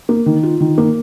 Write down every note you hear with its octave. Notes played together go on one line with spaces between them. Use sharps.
A#3
D#3
F4
D#3
A#3